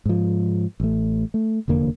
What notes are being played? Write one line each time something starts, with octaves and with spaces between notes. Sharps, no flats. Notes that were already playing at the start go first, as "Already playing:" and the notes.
G#2 F3
A1 A3
A3
F1 E2 D3 A#3